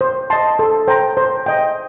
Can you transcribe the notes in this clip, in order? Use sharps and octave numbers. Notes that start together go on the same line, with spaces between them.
C5
D#5 A5 C6
A4
C5 G5 A#5
C5
D#5 G5